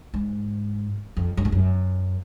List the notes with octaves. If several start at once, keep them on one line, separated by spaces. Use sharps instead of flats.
G#2
F2
F#2
G#2
F#2